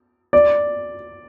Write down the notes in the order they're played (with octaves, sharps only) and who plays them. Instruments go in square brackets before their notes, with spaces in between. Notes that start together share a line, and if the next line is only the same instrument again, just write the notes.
[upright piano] D5